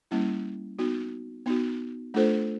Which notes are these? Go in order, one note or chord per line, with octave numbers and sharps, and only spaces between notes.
G3 A#3 C#4 E4
B3 D#4 F#4
B3 D#4 F#4
A3 D4 F4 A4 C5